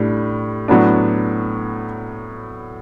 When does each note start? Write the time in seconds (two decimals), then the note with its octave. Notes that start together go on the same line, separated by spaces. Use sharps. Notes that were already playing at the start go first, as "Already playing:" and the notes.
Already playing: A2 G3 D4
0.68 A2 F#3 B3 D4